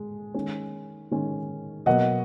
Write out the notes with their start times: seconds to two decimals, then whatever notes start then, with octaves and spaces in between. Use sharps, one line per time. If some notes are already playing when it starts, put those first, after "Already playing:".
Already playing: G#3
0.34 D#3 G#3 C#4
1.11 D#3 G#3 C#4
1.86 B2 F#3 A#3 D#5 F#5